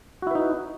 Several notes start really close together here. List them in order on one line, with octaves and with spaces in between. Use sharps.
F#4 E4 B4 D#4